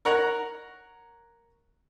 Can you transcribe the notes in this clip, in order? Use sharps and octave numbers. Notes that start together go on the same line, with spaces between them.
A#4 C#5 F#5 A#5